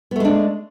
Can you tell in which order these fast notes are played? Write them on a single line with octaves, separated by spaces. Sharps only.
B3 A3 G#3 D4